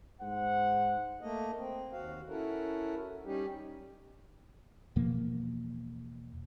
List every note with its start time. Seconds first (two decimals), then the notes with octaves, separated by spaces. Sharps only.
0.21 G#2 C5 F#5
1.21 A3 A#3 D#5
1.58 C4
1.92 D#2 F#4 F5
2.29 C#4 E4 F#4 A4 A#4
3.25 G3 C#4 D#4 G4
4.96 E2 B2 F3 A#3